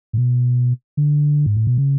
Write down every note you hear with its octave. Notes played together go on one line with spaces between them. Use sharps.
A2
B2
D3
G#2
A2
B2
C#3